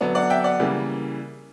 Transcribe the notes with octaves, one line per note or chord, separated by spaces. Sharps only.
D3 F#3 B3 D4
D5 F#5
E5 G5
D5 F#5
C#3 E3 G3 A#3